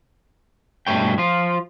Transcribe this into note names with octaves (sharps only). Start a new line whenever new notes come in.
G2 B2 A3 C#5 G5
F3 F4